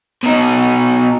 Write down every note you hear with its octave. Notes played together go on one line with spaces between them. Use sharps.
B2 D#4